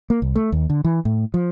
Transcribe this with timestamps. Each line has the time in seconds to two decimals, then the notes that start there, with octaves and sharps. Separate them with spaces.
0.10 A#3
0.22 C2
0.35 A3
0.52 D#2
0.70 D3
0.85 E3
1.05 A2
1.34 F3